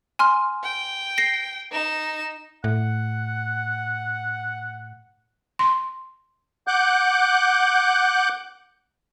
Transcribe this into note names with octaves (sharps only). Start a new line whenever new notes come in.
G#5 C6 F6
G5
A#6 C7
D#4 E7
A2 F#5
C6
F#5 D6 F#6 G6